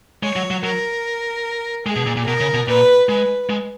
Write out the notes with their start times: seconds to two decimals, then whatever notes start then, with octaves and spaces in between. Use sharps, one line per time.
0.23 G#3 C#5
0.36 F#3
0.51 F#3
0.63 F#3 A#4
1.86 G#3 G#4
1.96 B2
2.06 A#2
2.17 A#2
2.26 B2 A#4
2.40 C#3
2.54 B2
2.68 A#2 B4
3.09 G#3 B4
3.50 G#3